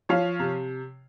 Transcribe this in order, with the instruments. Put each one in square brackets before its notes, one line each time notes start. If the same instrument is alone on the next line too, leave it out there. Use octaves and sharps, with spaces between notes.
[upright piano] F3 C#5 F5
C3